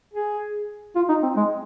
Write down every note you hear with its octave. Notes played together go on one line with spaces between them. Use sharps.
G#4
F4
D#4
C4
G#3